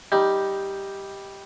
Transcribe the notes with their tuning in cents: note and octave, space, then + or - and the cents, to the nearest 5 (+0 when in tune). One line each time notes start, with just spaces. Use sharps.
G3 +0 D#4 +10